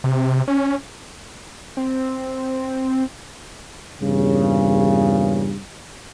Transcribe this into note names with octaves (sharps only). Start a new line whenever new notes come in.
C3
C#4
C4
E2 G2 A#2 C#3